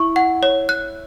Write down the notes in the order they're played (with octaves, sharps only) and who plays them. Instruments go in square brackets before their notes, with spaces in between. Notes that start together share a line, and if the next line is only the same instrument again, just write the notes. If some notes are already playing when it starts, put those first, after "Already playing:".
Already playing: [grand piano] E4 [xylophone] C#6
[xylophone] F#5
C#5
F#6